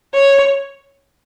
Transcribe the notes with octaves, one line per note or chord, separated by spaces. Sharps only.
C#5